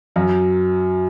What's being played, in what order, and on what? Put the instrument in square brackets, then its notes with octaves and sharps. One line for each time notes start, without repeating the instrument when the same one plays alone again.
[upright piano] F#2 F#3